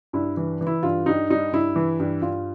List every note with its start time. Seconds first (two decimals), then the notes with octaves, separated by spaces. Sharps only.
0.13 G2 E4
0.37 E3
0.61 E3
0.67 E4
0.83 G2 F4
1.06 G2 D#4
1.29 G3 D#4
1.52 G2 E4
1.76 E3
2.00 G2
2.22 G2 F4